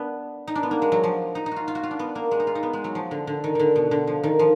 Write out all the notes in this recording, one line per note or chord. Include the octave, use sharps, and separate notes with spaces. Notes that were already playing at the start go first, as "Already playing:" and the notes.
Already playing: B3 D4
D#4
D4
B3
A#3
G#3
F#3
F3
D#4
D#4
F4 F#4
F4
F#4
F4
D4
B3
A#3
G#3
D#4
F4
D#4
B3
G#3
F#3
F3
D3
D3
D#3
D3 D#3
B2
D3
F3
D#3
F3